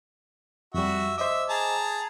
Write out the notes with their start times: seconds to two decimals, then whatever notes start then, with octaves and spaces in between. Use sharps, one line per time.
0.74 F2 G3 F#4 E5
1.18 C5 D#5 E5 D6
1.49 G#4 A5 A#5